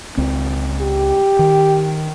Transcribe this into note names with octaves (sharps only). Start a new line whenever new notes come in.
C#2 C4
G4
D#3